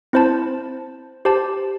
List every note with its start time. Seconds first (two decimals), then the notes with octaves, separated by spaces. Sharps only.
0.13 C4 E4 C5 A5
1.25 G4 C5 A5